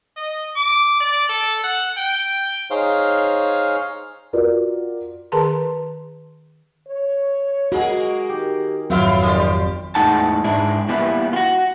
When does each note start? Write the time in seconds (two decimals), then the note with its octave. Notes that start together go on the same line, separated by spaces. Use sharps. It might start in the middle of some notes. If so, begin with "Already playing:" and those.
0.16 D#5
0.56 D6
1.00 D5
1.29 A4
1.64 F#5
1.97 G5
2.70 D#4 G#4 C5 C#5 F5 F6
4.33 F4 F#4 A#4 D5
5.32 D#3 G#4 B4 A#5 C6
6.87 C#5
7.72 G#3 A#3 F#4 G#4
8.30 D#3 G4
8.90 G#1 F2 F#3 B3 E4 F4 F5
9.21 D#2 G3 F4 G4
9.95 E2 A2 G#3 D#4 F#5 A5
10.44 G#2 G#3 D4 E4
10.89 E3 G3 A#3 B3 E4
11.33 F4 F#4